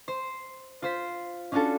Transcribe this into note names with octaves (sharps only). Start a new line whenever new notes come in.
C5
F4 C5 B6
C#4 D4 F4 F#4 A4